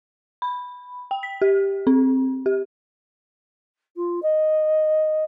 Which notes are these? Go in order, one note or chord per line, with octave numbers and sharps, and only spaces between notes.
B5
G5
B6
G4
C4
G4
F4
D#5